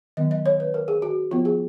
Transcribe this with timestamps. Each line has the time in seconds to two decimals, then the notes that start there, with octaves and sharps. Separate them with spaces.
0.17 D#3 F#3 B3 D#5
0.31 D#5
0.46 C#5
0.60 B4
0.74 A#4
0.88 G#4
1.02 F#4
1.31 F3 B3 F4
1.45 G#4